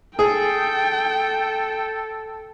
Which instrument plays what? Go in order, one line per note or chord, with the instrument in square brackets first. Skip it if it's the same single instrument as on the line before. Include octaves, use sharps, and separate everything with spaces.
[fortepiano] G#4 [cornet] A4 [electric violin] G5